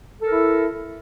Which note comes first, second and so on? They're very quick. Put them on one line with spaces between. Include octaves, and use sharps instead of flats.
A4 A#4 E4